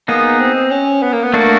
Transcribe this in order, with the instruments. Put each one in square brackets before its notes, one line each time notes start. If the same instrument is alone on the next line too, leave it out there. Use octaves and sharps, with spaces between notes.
[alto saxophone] A#3 [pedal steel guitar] B3 D#4 G#4
[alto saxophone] C4
C#4
B3
A#3
B3
[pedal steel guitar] A3 D4 F#4 [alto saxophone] A#3